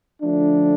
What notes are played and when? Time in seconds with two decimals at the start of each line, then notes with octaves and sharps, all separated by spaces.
0.22 D3 F3 A3 D4